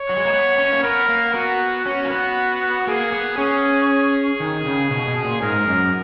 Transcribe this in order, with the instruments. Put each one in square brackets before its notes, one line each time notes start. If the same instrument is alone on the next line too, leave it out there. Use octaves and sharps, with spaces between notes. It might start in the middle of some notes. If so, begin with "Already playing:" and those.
Already playing: [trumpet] C#5
[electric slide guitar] F#3
G#3
A#3
B3
C#4
A#3
[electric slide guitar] B3 [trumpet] A#4
[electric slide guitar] A#3
[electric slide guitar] B3 [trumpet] F#4
[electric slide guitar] C#4 [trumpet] F#4
[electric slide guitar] A#3
B3
[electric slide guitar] A#3 [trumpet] G#4
[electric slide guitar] B3
[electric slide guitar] C#4 [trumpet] G#4
[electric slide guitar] D#3
C#3
B2
B2
A#2
[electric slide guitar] G#2 [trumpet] A#4
[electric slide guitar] F#2